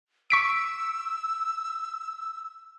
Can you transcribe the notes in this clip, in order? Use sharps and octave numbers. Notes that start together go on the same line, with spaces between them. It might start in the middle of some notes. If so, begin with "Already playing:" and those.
C#6 E6 B6 D7